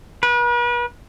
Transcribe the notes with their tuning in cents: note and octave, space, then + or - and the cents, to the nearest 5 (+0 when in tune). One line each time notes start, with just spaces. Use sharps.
B4 -40